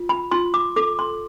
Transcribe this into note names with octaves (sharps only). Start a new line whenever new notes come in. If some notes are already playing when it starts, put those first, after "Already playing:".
Already playing: F4
B5
F4 C6
D6
A4 D6
C6